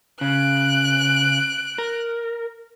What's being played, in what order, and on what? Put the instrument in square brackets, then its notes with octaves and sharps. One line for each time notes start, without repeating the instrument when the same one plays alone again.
[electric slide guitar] C#3 [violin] F#6 D7
[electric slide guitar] A#4